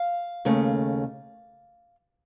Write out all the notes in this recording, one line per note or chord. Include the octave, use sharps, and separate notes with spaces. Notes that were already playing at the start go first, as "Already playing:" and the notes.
Already playing: F5
D#2 C#3 A3